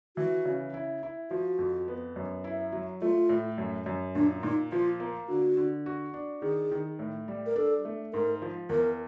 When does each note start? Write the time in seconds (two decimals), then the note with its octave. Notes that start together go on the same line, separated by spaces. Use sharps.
0.16 E3 F#4
0.45 C#3
0.74 E4
1.03 E4
1.30 F3 F#4
1.59 F2
1.88 B3
2.16 F#2
2.44 E4
2.72 F#3
3.02 A3 F4
3.29 A2
3.58 F#2
3.86 F#2
4.15 A#2 D4
4.43 A#2 D#4
4.72 F3 F4
5.00 A#3
5.29 D3 F#4
5.57 D3
5.86 F#4
6.14 D4
6.42 D#3 G#4
6.72 D#3
6.99 A2
7.28 G3
7.46 A#4
7.56 D4 A4
7.85 A3
8.13 G#2 A#4
8.42 F3
8.69 E2 A#4